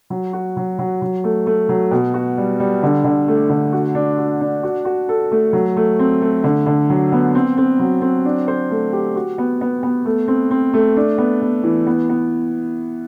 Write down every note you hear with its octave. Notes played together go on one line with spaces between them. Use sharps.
F#3
F#4
F#3
F#3
F#3
A3
A3
F#3
B2
F#4
G3
G3
D3
D3
A3
D3
F#4
D4
F#4
D4
F#4
F#4
A4
A3
F#3
A3
C4
A3
D3
D3
F#3
B3
C4
C4
F#3
C4
D4
C5
A3
G4
F#4
B3
B3
B3
A3
C4
C4
A3
D4
B3
B3
E3
B3
B3